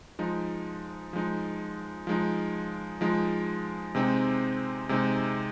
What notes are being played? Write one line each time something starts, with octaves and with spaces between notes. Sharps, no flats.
F3 G#3 D#4
F3 G#3 D#4
F3 G#3 D#4
F3 G#3 D#4
C3 G#3 C4 D#4
C3 G#3 C4 D#4